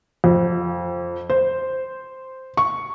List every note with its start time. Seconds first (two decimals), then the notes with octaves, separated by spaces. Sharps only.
0.24 F2
1.30 C5
2.57 C#6